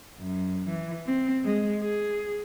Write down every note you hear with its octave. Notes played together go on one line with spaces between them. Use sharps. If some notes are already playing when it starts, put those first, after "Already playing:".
F#2
E3
C4
G#3
G#4